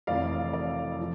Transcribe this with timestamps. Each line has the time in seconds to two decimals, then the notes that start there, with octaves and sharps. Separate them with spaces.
0.07 F1 F2 E3 D5 F5
0.53 D5
0.99 F3